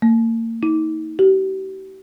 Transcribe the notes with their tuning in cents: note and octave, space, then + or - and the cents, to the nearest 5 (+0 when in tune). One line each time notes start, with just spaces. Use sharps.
A#3 -35
D#4 +30
G4 -40